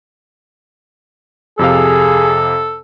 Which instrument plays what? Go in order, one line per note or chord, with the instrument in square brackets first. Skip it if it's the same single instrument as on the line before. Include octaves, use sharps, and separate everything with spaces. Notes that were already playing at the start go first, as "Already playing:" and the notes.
[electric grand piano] F2 C3 F5 [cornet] G#4 [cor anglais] A4